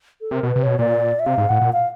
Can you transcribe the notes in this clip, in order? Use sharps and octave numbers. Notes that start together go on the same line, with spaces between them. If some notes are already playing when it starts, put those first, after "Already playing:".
A4
C3 A#4
B2
B4
C3
B2 C#5
A#2 D5
E5
C3 F5
G#2
A2 F#5
A#2
F5